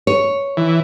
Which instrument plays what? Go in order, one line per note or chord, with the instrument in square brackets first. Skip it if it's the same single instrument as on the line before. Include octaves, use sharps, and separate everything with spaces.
[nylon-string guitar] C#5
[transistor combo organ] E3